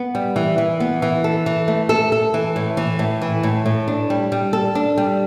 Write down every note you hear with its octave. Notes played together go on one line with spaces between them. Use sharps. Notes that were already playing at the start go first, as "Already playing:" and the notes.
Already playing: B3
G3
E3
E3
B3
E3
A4
E3
A3
A4
A4
E3
A2
E3
A2
E3
A2
A2
D4
G3
G3
A4
D4
G3